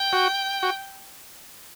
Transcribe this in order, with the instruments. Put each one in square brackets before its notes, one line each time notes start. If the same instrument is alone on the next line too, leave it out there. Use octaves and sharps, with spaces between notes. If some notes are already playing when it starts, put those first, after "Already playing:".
Already playing: [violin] G5
[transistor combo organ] F#4
F#4